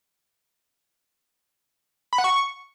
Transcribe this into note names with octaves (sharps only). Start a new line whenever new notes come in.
B5
F#5
C#6